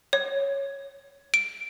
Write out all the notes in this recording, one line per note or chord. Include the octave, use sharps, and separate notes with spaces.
C#5
D7